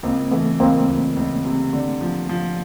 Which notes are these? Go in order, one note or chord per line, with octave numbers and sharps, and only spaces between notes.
C#2 A#3 C4
E3 A3 B3
C#2 A#3 C4
C#2
C#2
C3
D3
F3
F3